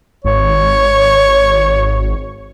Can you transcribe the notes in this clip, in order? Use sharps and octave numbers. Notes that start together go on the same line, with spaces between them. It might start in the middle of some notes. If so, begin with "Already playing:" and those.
G#1 C#5